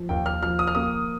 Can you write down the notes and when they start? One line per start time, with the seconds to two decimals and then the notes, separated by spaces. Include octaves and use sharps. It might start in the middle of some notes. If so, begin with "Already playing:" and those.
Already playing: F3
0.09 D#2 G5
0.26 F6
0.43 F3 F6
0.59 D#6
0.67 F6
0.75 A#3 D#6